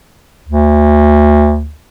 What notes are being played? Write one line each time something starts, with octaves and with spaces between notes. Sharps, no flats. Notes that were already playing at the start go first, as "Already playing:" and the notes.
D2